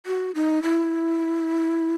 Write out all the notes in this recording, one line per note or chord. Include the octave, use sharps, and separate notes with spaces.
F#4
D#4
E4